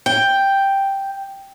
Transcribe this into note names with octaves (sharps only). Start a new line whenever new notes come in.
G5